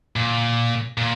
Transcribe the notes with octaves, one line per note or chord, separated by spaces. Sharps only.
A#2
A#2